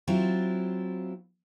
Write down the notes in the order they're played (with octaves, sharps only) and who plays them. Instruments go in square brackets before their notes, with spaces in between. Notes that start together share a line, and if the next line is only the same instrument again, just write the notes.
[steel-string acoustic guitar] F#3 C4 E4 F4